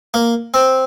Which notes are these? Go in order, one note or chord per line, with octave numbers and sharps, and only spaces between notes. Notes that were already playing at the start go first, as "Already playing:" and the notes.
A#3
C4